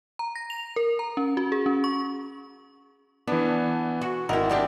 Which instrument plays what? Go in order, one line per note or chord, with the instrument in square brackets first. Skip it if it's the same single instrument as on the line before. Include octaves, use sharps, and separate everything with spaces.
[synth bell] A#5
A#6
F7
A#4
A#5
C#4
F#4
G#4
C#4
C#6
[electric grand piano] E3 B3 [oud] D4
[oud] F#4
[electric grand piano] G#1 D#5 F#5 [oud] E4 A#4
[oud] G3 D4 G4